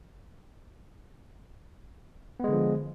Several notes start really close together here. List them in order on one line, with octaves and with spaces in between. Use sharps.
B3 G#3 D3 F3